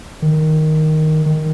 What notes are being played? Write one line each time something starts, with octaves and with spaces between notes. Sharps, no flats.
D#3
D#3